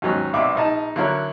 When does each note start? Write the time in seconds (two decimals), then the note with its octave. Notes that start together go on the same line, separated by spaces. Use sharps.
0.02 D#2 G#2 F#3 C#4
0.33 B1 C3 D5 E5 D6
0.55 A#1 D#4 A5
0.96 D3 F#3 E4 A#4 C#5